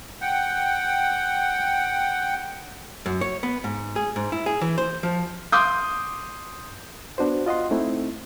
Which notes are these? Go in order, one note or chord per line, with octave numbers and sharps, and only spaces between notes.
F#5 G5
F#2
C#5
B3
G#2
G#4
G#2
E4
G#4
E3
C5
F3
C6 D6 D#6 G6
B3 D4 F#4 C5
F4 D#5 F#5 C6
A3 C4 D#4 E4